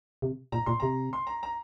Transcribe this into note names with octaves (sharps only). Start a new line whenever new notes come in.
C3
A#2 A#5
A#2 C6
C3 A#5
C6
A#5
A#5